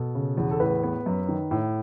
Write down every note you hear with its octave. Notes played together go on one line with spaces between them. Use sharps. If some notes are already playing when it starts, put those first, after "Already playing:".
Already playing: B2 A4
C#3
E2
A4
A2 B4
B3
F#2
D#3
A2